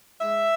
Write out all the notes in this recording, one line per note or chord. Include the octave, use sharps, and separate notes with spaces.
G#3 E5